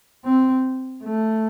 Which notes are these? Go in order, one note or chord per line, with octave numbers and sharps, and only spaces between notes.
C4
A3